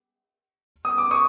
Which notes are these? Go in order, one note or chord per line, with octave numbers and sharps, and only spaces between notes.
D#6
D6
C#6 D#6